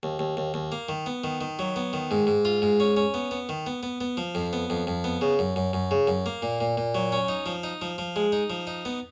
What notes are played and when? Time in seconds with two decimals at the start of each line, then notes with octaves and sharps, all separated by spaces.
0.03 D#2
0.19 D#2
0.37 D#2
0.54 D#2
0.72 A#3
0.89 D#3
1.06 B3
1.24 D#3
1.41 D#3
1.59 F#3
1.76 B3
1.93 D#3
2.11 G#2
2.27 G#2
2.45 F4
2.62 G#2
2.80 C#4
2.97 C#4
3.14 B3
3.31 B3
3.49 D#3
3.66 B3
3.83 B3
4.01 B3
4.17 F3
4.35 F2
4.53 B3
4.70 F2
4.87 F2
5.04 B3
5.21 C#3
5.39 F#2
5.56 F#2
5.73 F#2
5.91 C#3
6.07 F#2
6.26 A#3
6.42 A#2
6.61 A#2
6.77 A#2
6.95 F#3
7.12 C#4
7.28 D#4
7.46 F3
7.64 D#4
7.82 F3
7.98 F3
8.16 G#3
8.32 D#4
8.50 F3
8.67 D#4
8.85 B3